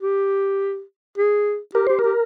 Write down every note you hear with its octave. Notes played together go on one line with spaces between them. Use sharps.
G4
G#4
G4 A#4
G4 C5
G4 A#4